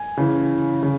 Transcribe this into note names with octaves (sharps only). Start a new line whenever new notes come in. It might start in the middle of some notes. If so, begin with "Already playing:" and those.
Already playing: G#5
C#3 E3
C#3